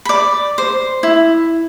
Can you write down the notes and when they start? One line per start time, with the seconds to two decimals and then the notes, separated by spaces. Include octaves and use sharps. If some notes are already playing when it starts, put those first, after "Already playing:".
0.05 D5 B5
0.58 C5
1.03 E4